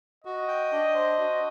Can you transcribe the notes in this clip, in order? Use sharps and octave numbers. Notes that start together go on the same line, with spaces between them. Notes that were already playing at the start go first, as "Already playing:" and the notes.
F#4 D#5
G5
D4
C5
F#4